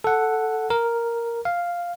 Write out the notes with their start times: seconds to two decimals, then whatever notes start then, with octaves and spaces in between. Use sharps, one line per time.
0.04 A4 F#5
0.70 A#4
1.45 F5